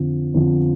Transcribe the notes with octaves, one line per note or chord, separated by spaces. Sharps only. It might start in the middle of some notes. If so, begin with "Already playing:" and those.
Already playing: F2 D3 F3
F2 D3 F3